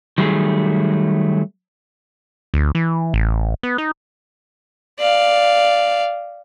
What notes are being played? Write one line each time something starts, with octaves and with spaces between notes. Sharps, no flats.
D#3 F#3 G3 A3 D4 G#4
D2
E3
A1
B3
D#4
D5 F5